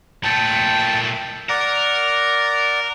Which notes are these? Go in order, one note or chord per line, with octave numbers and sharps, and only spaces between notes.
A#2 A3 G5 A5
A#4 D5 F#5